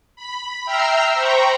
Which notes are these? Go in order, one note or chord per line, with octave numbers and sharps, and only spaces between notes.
B5
E5 G5 A#5 E6 F6 C7
C5 G5 A#5 B5 C#6